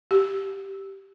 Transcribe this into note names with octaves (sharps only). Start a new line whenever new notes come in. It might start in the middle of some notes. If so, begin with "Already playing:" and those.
G4